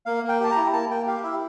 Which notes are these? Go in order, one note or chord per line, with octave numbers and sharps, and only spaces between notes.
A#3 F5
A#3
G5
G4 A5
A#5
E4
A#3 A5
A#3 G5
G4 F5
E4 E5